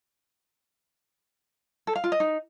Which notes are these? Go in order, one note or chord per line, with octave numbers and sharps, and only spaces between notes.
A4
F5
F4
D#5
D#4